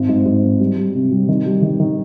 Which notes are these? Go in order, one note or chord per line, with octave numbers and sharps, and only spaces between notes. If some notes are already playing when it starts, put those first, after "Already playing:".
Already playing: G#1
G#2
G#2
G#1
G3
G3
C3
G3
D#3
G3
D#3
D#3